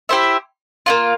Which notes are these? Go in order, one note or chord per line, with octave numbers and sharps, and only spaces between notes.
E4 G4 C5 E5
A#3 D4 F4